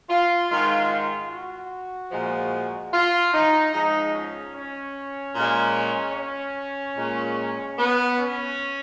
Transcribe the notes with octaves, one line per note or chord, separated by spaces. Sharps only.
F4
G#2 D#3 G#3 F4
F4
F#4
A#2 F3 G#3
F4
D#4
G#2 F3 G#3 D#4
C#4
C#4
A#2 G#3
C#4
A#2 G#3
B3
C#4